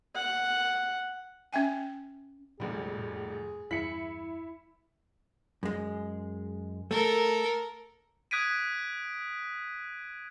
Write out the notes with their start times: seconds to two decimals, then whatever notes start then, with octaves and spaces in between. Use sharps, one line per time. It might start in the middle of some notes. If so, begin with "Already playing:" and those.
0.15 F#5
1.53 C#4 E5 G5 G#5
2.60 F1 A#1 A#2 G3 G#3 B3 G#4
2.97 F2 A2
3.71 E2 G2 E4 B6 C#7 F#7
5.63 F#2 G#3
6.91 A3 A4 A#4
8.31 D#6 F#6 G#6 B6 D7 D#7